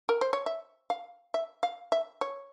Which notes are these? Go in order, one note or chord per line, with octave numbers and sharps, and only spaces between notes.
A#4
C5
C#5
E5
F5
E5
F5
E5
C#5